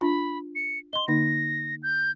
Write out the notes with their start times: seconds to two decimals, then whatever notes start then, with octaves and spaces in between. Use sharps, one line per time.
0.01 D4 F4 B5
0.55 C#7
0.93 D#5 C6 G7
1.08 D3 A#3 D#4 A#6
1.83 G6